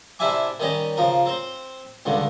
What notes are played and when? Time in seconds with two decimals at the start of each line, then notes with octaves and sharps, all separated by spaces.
0.19 C3 D4 E4 E5 G#5 D6
0.60 D#3 G3 C#4 D#5
0.97 C#3 F3 A#4
1.26 C4 C5
2.05 C#2 G2 D3